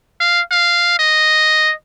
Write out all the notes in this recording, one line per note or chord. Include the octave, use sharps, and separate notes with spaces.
F5
F5
D#5